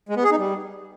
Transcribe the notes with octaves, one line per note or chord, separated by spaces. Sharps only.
G#3
B3
G#4
D#4
G3